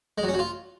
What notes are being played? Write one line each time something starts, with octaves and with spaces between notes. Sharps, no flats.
G#3
F#3
C#4
F#3
F4